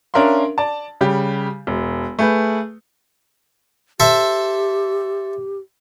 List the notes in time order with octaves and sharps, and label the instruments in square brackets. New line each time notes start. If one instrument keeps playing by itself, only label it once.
[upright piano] C#4 D4 A#4 E5 F5 C6
D5 A5
C#3 G3 G4
E1
A3 G#4 B4
[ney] G4 [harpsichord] A4 C5 E5